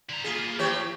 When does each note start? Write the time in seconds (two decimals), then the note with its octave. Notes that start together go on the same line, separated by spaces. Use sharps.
0.09 D3 A#5
0.24 A#3 B3 F4 G#4
0.59 E3 G4 C#5